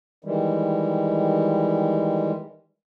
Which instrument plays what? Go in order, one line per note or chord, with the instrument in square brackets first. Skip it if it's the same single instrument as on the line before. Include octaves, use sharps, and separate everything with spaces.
[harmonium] D#3 E3 G3 G#3